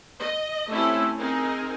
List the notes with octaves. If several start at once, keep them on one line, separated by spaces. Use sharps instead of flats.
D#5
A3 C4 C#4 E4 G4 A4
C4 D#4 G#4 A#4